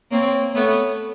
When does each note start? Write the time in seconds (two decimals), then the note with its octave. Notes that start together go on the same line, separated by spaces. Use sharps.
0.11 A#3 C4 C#5
0.54 A3 B3 C#5